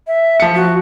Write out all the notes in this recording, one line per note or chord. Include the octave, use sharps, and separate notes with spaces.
E5
F3 C#7
F#4